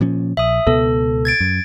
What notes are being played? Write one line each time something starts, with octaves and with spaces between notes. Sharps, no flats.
A#2 F3 C#4
A#1 E5 D#6
C#2 B2 B3 A4
G#6 A6 D7
F#2